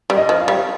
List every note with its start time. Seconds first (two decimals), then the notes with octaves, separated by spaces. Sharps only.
0.10 G3
0.16 D#5
0.29 F3
0.41 F5
0.48 G3